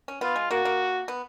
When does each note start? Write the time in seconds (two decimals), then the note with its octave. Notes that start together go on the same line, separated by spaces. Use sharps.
0.08 C#4
0.21 B3 F4
0.36 G#3
0.51 A#3 F#4
0.65 A#3
1.08 B3